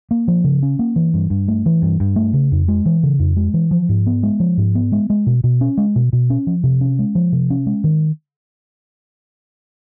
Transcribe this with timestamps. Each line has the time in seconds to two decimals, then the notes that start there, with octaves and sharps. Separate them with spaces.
0.11 A#3
0.28 F3
0.44 C#3
0.63 C#4
0.79 A#3
0.96 E3
1.14 G2
1.30 G2
1.48 A3
1.66 E3
1.82 G2
2.00 G2
2.16 A3
2.33 C#3
2.52 F2
2.68 G#3
2.86 E3
3.03 C#3
3.19 F2
3.36 G#3
3.54 E3
3.71 F3
3.89 G#2
4.06 B3
4.23 G#3
4.40 F3
4.57 G#2
4.75 B3
4.92 G#3
5.10 G#3
5.27 B2
5.44 B2
5.61 C#4
5.77 G#3
5.96 B2
6.13 B2
6.30 C#4
6.47 F3
6.64 C3
6.81 C#4
6.99 G#3
7.15 F3
7.32 C3
7.50 C#4
7.66 G#3
7.84 D#3